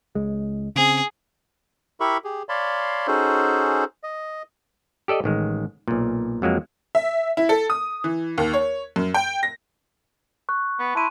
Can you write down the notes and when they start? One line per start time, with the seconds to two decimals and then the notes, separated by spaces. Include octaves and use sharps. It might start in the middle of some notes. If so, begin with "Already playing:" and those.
0.15 C#2 G#3
0.76 C#3 C4 G#4
2.00 E4 G4 A#4 E5 B5 C#6
2.24 G4 G#4
2.49 C#5 D5 F5 A5 B5 C6
3.07 C#4 D#4 F#4 G#4 A4 C5
4.03 D#5
5.08 G4 A4 D5 D#5
5.24 A1 D#3 G#3
5.88 B1 A#2
6.42 F2 F#3 G#3 A#3
6.95 E5
7.37 E4
7.49 A4
7.70 D#6
8.04 E3
8.38 D#2
8.54 C#5
8.96 F#2
9.14 G5
9.43 A#6
10.49 C#6 F#6
10.79 B3
10.95 E4 A5 C6 D#7